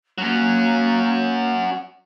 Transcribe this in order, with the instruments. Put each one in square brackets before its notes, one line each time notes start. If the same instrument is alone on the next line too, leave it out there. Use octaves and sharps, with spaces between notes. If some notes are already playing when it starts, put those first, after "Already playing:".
[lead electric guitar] F#3 C#4 [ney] A#3